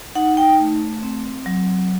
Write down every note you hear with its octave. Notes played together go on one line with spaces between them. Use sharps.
D#4 F#5
G5
A3
C4
F#3